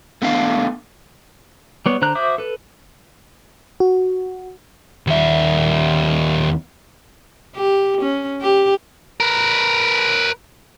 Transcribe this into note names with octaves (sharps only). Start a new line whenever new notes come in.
A3 B3 D4 F5
G3 B3 C#5
D3 C5 A#5 F#6
F#4 C5 E5 D6 D#6
A4 B4
F#4
D#2 E5
G4
C#4
G4
A#4 B4